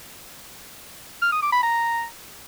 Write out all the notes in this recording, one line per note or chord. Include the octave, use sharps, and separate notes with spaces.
F6
D#6
D6
B5
A#5